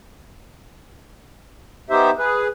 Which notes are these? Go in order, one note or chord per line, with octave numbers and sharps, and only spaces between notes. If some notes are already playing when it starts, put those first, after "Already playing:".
B3 D#4 G4 C5 E5
G#4 B4